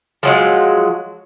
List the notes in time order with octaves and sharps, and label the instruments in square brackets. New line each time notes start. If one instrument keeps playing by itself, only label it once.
[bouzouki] F3 F#3 G#3